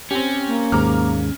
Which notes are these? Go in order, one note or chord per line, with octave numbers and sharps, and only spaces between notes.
C4 C#4 G4
A#3
D#2 G#2 A#5 D6 F6